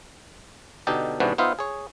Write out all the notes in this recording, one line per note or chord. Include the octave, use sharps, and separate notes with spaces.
B2 D3 D#4 G4 A4
G#2 C3 E3 B3 D4 F#4
B3 D#4 F4 C5 E5 F5
G#4 C#5